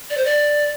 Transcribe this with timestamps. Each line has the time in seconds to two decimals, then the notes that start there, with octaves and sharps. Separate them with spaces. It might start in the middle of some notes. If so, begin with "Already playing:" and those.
0.10 D5
0.17 C5
0.25 D5